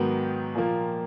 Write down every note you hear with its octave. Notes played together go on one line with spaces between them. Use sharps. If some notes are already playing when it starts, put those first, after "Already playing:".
Already playing: G#2 D#3 F#3 B3
A#2 F3 A#3